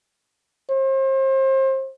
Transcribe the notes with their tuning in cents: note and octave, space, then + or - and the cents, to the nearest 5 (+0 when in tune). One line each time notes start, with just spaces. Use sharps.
C5 +35